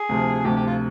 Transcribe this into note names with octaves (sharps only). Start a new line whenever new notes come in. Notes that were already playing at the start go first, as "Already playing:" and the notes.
Already playing: G#4
D2 C3 F3
D2 C3 F3 G4
G4
F4